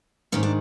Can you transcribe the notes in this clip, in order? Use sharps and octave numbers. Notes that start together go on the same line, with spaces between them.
G#2 D#3 G#3 C#4
D4